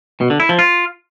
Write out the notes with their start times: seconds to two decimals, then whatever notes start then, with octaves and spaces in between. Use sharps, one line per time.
0.21 B2
0.30 D3
0.40 E4
0.49 F3
0.59 F4